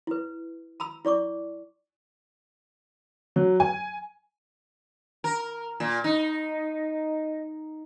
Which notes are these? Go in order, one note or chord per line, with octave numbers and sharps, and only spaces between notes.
E4 B4
A#5 B5 E6
E4 D5 C#6 D6
F#3
G#5
A#4
A#2
D#4